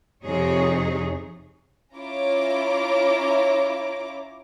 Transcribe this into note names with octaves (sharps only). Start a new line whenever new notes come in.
F2 C3 D#4 G#4 C#5
C#4 E4 F4 C#5 A#5 D6